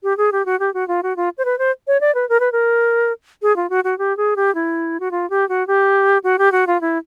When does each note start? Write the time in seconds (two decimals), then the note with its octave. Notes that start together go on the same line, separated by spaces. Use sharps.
0.03 G4
0.17 G#4
0.32 G4
0.46 F#4
0.60 G4
0.74 F#4
0.88 F4
1.03 F#4
1.17 F4
1.38 C5
1.45 B4
1.59 C5
1.87 C#5
2.01 D5
2.15 B4
2.29 A#4
2.40 B4
2.52 A#4
3.42 G#4
3.56 F4
3.70 F#4
3.84 F#4
3.99 G4
4.17 G#4
4.36 G4
4.55 E4
5.00 F#4
5.11 F4
5.30 G4
5.49 F#4
5.67 G4
6.24 F#4
6.39 G4
6.52 F#4
6.67 F4
6.81 E4